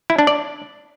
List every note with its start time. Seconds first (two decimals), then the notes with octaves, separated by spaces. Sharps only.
0.10 E4
0.18 D4
0.27 D5